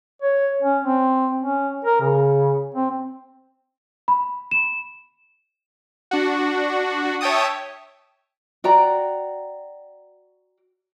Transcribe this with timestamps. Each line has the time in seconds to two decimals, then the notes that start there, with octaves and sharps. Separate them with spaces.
0.22 C#5
0.63 C#4
0.85 C4
1.40 C#4
1.85 A#4
2.01 C#3
2.75 C4
4.08 B5
4.51 E7
6.11 D4 F#4
7.21 C#5 E5 G5 A5 D#6
8.64 F#4 D5 G5 A#5